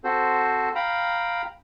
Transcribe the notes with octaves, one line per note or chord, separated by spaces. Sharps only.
C4 F#4 A4 C5
F5 G5 A#5 B5